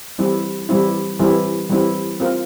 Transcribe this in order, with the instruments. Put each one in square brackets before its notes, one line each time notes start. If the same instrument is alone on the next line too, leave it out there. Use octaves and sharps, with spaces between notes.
[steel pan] E3 G3 C4 E4
E3 G3 C4 E4
E3 G3 C4 E4
E3 G3 C4 E4
C4 F4 A#4